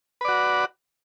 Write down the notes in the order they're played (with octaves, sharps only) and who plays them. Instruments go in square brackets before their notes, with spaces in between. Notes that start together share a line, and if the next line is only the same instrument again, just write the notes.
[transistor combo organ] B4
D5
F#4